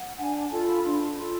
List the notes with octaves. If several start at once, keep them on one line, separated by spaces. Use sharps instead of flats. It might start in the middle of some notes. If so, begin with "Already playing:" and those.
Already playing: F#5
D4 G#5
A5
F4 A4
B5
D4 C6
F4 A4